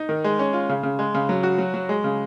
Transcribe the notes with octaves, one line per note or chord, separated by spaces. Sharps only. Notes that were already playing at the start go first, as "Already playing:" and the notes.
Already playing: D#4
D#3
G#3
C#4
F4
C#3
C#3
G#3
C#3
F#3
F#4
F#3
F#3
G#3
C#3